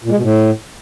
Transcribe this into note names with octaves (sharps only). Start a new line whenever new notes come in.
A#2
G#3
B2
A2